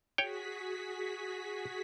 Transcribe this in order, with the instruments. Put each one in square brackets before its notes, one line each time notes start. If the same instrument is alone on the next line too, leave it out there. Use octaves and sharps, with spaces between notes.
[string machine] F#4 G#4 B6 [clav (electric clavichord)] C#5 G5